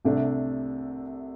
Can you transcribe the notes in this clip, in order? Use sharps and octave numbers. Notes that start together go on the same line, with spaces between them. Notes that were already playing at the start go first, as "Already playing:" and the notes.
C2 C3 A3 D4